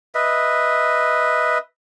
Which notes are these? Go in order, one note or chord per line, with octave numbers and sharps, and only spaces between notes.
B4 D#5 E5